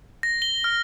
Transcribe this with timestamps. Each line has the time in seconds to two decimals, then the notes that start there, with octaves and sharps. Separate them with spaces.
0.23 A#6
0.42 G7
0.64 F6